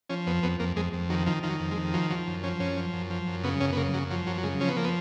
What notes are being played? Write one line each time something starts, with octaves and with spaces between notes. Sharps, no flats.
F3 C#4
F2 B3
F2 B3
F2 A#3
F2 G#3
F2
D#3 F#3
D#3 F3
D#3 F3
F#3
F2
G#3
D#3
F3 F#3
F3 F#3
F#2
F3 C#4
F#2 C#4
F3
F#2
F3
F#2
C#3 B3
F#2 C#4
B3
C#3 A#3
F#2 F#3
F3 F#3
F#2 F#3
F#3
C#3 G#3
F3 C#4
B3
F3 A#3
B3